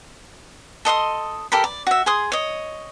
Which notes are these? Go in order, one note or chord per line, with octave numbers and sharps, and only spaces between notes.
A4 D#5 C6 D#6
G4 A4 A#4 B5
D5
F#4 E5
G#4 C6 D#6
C#5 D#5